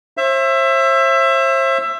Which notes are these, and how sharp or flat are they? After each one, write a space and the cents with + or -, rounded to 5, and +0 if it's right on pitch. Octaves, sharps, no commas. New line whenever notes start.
C5 +40 E5 +20